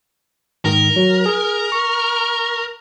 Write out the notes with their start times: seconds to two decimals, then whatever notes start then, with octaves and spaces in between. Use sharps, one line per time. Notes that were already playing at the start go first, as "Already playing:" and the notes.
0.65 G#2 D#3 A#4
0.96 F#3
1.26 G#4
1.72 C#6